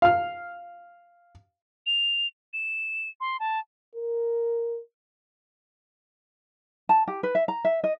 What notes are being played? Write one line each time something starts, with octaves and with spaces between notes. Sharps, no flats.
F5 F6
F7
E7
C6
A5
A#4
A5
G4
B4
E5
A#5
E5
D#5